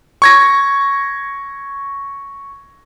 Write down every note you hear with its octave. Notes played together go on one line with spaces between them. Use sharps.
C#6 G#6 A#6